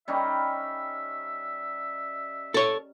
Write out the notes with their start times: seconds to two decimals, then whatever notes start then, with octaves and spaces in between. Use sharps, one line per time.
0.08 G3 C#4 D#4 E5
2.54 A4 C#5